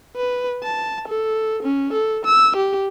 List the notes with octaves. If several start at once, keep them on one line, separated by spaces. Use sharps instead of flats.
B4
A5
A4
C#4
A4
E6
G4